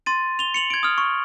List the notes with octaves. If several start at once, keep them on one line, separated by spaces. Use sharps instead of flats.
C6 A6 D#7
F7 G7
C#7 F7 F#7
G#6 D7
D#6 F6
C#6